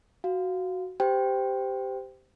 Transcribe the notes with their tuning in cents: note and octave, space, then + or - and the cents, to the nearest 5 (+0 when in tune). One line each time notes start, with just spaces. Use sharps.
F#4 +0 F5 +0
G4 +0 C5 -20 G5 +0